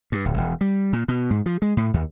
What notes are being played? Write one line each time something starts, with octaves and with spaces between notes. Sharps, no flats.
G2
D1
E1
G3
A#2
B2
G#2
F3
G#3
A2
D#2